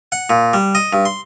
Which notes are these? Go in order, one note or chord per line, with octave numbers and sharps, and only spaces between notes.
F#5
A#2
G3
D#5
G2
C6